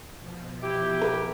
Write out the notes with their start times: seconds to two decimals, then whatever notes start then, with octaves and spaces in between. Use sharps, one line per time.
0.20 B2 F3
0.62 E4 G4
0.99 G#4 A#4 B4